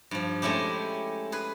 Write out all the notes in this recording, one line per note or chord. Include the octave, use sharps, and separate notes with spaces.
G2 F3
G#3 A3 C#4 E4 G4
G#4 B4